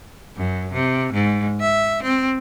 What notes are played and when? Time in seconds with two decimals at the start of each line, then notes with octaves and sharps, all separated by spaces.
0.37 F#2
0.73 C3
1.13 G#2
1.60 E5
2.03 C4